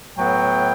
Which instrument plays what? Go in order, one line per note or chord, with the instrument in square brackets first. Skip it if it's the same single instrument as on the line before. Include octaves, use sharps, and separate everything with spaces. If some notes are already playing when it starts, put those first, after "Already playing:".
[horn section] A2 F#3 B3 E4 G5